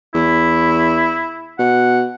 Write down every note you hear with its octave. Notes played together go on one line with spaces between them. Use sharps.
E2 E4
B2 F#5